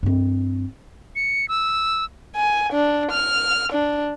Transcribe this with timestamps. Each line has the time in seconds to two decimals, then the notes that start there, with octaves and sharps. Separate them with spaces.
0.03 G2 C4
1.16 C#7
1.48 E6
2.36 G#5
2.73 D4
3.11 F6
3.72 D4